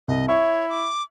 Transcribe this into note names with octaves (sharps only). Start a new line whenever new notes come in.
C2 D#5
E4 C#5 E5 C#6
D6